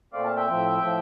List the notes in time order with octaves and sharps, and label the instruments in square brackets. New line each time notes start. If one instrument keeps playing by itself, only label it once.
[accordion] A#2 A3 C4 D5 F5
F5 A5
E5 G5
A2 F3 C4
A2 F3